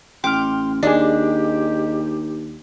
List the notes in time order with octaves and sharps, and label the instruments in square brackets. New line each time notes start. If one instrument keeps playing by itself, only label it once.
[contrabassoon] A1 [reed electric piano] G5 F6 [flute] C6 [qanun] D6
[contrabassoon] D#2 [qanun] D4 [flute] G4 [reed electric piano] G#4 D#5